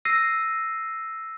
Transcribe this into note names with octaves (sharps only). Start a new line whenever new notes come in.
E6 A#6 C7 D#7